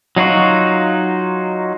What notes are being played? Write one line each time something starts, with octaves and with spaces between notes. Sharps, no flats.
F#3 D#4 F4 F#4